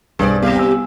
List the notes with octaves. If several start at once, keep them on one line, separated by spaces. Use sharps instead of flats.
B1 G2 C4 G#4 D5
C2 B2 B3 G4 F5
C#4 G#5 E6